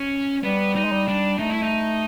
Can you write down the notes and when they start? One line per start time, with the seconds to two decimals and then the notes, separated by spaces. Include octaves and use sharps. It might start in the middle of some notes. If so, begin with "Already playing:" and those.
Already playing: C#4
0.44 G3 B3
0.76 D#4
0.84 G#3
0.92 G3
1.08 D4
1.39 A3 D#4
1.50 E4
1.62 D#4